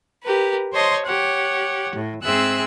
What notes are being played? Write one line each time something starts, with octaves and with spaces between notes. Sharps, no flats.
G4 A#4 B4
C5 C#5 D#5 A5 C6
G4 C#5 F#5
A2
G#2 C4 G#4 E5 E6 F#6